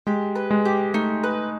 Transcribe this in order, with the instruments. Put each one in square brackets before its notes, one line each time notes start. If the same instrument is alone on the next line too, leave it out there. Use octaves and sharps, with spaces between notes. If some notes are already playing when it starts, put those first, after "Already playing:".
[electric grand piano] G#3 [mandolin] G4
[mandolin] B4
[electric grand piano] G#3
[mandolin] G4
[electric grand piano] A3 [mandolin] D#4
[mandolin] B4